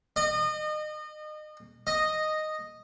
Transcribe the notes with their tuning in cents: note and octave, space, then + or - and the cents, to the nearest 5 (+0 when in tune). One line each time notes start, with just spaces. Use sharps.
D#5 -30
D#5 -5